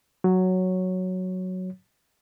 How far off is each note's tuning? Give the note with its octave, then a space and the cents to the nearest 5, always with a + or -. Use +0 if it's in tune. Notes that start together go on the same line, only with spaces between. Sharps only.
F#3 +0 C#5 +0